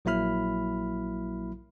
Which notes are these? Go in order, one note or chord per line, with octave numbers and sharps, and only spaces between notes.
A#1 F#3 A#3 E4 B5 F6